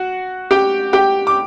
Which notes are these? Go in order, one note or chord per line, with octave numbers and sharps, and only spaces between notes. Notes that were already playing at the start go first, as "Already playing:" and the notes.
Already playing: F#4 F#5
G4 G5
G4 G5
D6